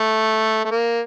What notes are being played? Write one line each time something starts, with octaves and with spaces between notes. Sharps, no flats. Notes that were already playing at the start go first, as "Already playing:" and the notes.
Already playing: A3
A3
A#3